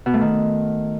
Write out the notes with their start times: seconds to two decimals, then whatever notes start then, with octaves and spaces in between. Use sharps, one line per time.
0.06 B2
0.14 A3
0.21 D#3